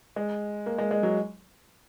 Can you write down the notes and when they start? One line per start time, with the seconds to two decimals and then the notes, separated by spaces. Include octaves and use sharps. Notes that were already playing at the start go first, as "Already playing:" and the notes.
0.16 G#3
0.66 A#3
0.78 G#3
0.91 G#3
1.03 F#3